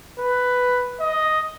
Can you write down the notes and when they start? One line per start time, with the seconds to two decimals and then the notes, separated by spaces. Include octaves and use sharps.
0.19 B4
1.00 D#5